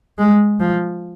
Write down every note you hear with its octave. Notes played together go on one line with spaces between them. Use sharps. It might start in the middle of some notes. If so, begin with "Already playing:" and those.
G#3
F3